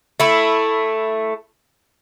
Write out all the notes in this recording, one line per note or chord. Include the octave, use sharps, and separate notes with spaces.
A3 E4